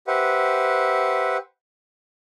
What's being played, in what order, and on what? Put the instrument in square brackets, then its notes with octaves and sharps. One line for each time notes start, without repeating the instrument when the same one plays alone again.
[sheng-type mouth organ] G4 B4 C5 E5 F#5